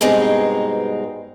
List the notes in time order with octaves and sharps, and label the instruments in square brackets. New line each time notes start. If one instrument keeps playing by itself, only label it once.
[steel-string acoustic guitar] G2 B2 G#3 C4 D#4